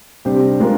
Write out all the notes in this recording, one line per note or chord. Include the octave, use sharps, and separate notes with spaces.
C3 G3 D4 G4 C5
G#3 D4 F4 A#4